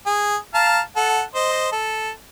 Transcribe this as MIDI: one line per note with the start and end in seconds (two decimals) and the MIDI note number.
0.06 0.36 68
0.54 0.80 77
0.54 0.80 81
0.54 0.80 82
0.97 1.22 69
0.97 1.22 78
1.35 1.69 72
1.35 1.69 75
1.72 2.10 69